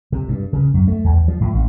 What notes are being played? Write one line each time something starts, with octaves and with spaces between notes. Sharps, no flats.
C3
G2
C#3
F#2
A3
E2
F3
A2
A1